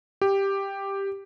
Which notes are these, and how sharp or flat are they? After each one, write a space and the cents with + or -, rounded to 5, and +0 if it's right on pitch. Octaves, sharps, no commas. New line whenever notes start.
G4 +5